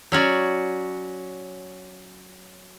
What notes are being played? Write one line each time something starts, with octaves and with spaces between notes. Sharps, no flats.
F#3 C#4 F#4 D5